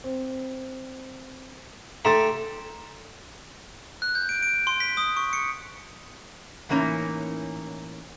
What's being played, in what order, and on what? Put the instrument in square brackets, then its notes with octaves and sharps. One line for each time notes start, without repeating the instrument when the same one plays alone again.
[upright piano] C4
[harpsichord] A3 G4 A4 [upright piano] A#5 C6 A6
[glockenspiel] F#6
G6
D7
D7
C6
B6
D#6
C#6
C#7
[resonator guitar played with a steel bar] A2 E3 A#3 C#4 D#4